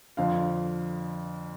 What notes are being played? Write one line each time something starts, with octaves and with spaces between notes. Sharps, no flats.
F2 D3 F3 F5